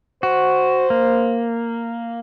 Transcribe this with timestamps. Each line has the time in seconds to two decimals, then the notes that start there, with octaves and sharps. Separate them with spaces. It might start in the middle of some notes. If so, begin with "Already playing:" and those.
0.23 F#4 C5
0.90 A#3